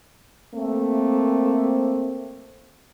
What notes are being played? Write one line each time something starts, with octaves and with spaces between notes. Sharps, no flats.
A3 A#3 C4